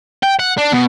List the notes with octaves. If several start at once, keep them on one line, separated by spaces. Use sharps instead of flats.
G5
F#5
D4
B2